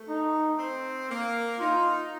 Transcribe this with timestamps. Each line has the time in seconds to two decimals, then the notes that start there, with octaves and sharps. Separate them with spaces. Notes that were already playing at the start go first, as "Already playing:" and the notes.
Already playing: A3
0.08 D#4
0.58 C4
1.09 A#3
1.58 D#4 F4